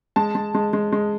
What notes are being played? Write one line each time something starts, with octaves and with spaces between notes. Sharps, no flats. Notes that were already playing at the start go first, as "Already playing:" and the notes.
G#3 A5
G#3
G#3
G#3
G#3